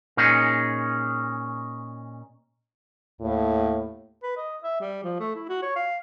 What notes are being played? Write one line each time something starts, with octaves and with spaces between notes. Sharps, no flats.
A#2 C#4 D#4 G#4
D#2 A2
B4
D#5
E5
G3
F3
A3
E4
F#4
C#5
F5